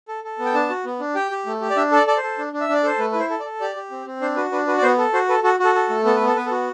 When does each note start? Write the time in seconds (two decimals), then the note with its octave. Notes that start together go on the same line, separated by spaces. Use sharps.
0.08 A4
0.24 A4
0.39 B3
0.45 G5
0.54 D4 A5
0.70 F#4
0.85 B3
1.00 D4
1.15 G4 G5
1.31 G4
1.46 A3
1.61 G4
1.70 D5
1.76 D4 E5
1.92 A4 D5
2.07 A4 D5
2.17 C5
2.22 A4
2.38 D4
2.53 D4
2.61 E5
2.69 D4 D5
2.83 A4 C5
2.99 A3 B4
3.12 B4
3.15 E4
3.20 C5
3.30 A4
3.40 D5
3.45 A4
3.60 G4 D5
3.76 G4
3.91 C4
4.06 C4
4.21 D4 C5
4.36 F#4 B4
4.52 D4 B4
4.67 F#4 B4
4.78 D5
4.82 B3 C5
4.98 A4
5.14 F#4 C5
5.29 A4 B4
5.43 F#4 A4
5.59 F#4 A4
5.75 A4
5.90 A3
6.05 B3 A4
6.16 B4
6.21 B3
6.26 A4
6.36 B3 B4
6.46 A4
6.51 F#4